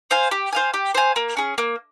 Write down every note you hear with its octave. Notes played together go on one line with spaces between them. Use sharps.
C5 F5 G#5
G4
C5 F5 G#5
G4
C5 F5 G#5
A#3
C#4 G#4
A#3